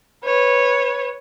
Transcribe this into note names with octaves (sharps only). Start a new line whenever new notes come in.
B4 C#5